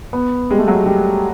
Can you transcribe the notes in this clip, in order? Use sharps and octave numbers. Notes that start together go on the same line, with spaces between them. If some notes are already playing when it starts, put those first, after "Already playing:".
B3
G3 G#3
A3
F#3 G#3
G3